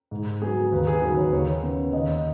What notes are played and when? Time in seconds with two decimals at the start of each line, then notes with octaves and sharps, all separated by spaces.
0.11 G#2
0.42 F#3 B3 G#4
0.72 D#2 B4
0.87 G#4
1.02 D#3 F#3 B4
1.17 C#5
1.32 D#2 C#5
1.63 C#3 B3
1.93 D#2 D#5